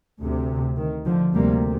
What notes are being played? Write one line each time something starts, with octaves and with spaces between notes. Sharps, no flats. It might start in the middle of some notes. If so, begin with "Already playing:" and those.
D2 C3
D#3
D3 F3
D2 C3 G3 A#3